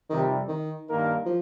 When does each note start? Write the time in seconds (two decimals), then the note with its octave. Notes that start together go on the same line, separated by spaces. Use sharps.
0.09 F2 C3 D#3 G3
0.48 D#3
0.87 G2 D#3 A#3 D#4 A#4
1.26 F3